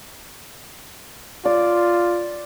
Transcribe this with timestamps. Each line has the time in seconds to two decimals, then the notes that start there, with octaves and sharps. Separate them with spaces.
1.45 F4 D5